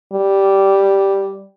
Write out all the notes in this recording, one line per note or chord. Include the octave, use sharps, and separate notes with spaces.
G3